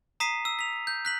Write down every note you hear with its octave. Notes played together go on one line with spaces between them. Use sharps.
A#5 D#6 B6 C7 D#7
E6
B6 F7
G6
F#6 B6 F#7